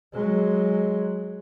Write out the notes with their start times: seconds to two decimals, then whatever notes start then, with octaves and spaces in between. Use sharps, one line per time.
0.13 F#3 G#3